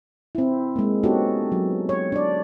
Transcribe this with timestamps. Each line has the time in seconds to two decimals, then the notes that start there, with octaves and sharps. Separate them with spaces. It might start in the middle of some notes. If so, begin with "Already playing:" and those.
0.35 C4 E4
0.76 G#3 A#3
1.03 B3 C#4 D#4 F#4 G4 A4
1.52 F#3
1.89 C#5
2.12 D4 D5